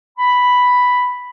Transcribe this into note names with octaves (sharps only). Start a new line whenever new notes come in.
B5